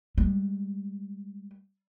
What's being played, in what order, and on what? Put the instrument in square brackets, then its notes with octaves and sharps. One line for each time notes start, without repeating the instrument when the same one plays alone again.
[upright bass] G3 G#3